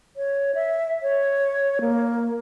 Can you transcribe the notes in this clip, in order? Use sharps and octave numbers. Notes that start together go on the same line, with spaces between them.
C#5
E5
C#5
A#3